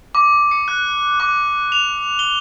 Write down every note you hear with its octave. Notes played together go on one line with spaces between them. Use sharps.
D6
C#7
F#6
D6
F7
G7